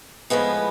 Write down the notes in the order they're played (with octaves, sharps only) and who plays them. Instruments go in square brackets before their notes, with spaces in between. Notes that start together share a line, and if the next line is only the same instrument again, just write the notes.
[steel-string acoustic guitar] A2 F3 G#3 B3 B4